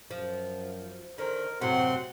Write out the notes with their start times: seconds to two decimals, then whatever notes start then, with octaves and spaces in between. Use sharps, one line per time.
0.11 F#2 F3
1.18 D3 D#3 A#4 C5
1.61 F#2 A2 C3 C4 F#4 F#5 C6